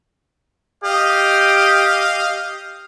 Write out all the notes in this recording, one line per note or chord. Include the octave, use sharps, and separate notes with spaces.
G4 D#5 F5